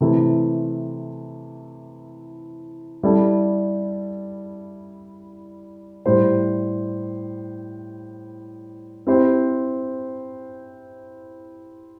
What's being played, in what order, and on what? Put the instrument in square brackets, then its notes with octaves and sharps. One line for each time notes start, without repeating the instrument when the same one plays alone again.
[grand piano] C3 E3 A3 E4
G3 E4 A4
A2 G3 E4 G4 C5
C4 E4 G4 C5